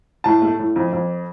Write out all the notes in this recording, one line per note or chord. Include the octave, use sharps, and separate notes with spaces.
A2 A5
A3
A2
F2
F2